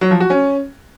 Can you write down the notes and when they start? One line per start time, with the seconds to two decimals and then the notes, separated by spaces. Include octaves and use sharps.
0.01 F#3
0.11 F3
0.20 F#4
0.30 C#4